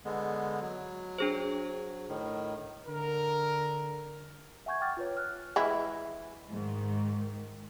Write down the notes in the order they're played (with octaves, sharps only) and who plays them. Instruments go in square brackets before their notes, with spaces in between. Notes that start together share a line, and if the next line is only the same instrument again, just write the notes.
[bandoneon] D3 G#3 B3
F#3
[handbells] D4 G#4 C5
[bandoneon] A2 D#3
[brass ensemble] D3 A#4
[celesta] E5 F#5 G#5 C#6 G6 G#6
F#5 G5 C#6 D6 F6 A6
F4 B4 C#5
F6 F#6
[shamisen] E3 G#3 E4
[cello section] G#2 D#3